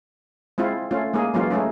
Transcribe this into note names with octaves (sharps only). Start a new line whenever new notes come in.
G#3 C4 E4 F4
A3 C#4 F4
G#3 A#3 D#4 G#4
E3 F#3 G#3 A#3 C#4 F4
G#3 A3 C#4 D#4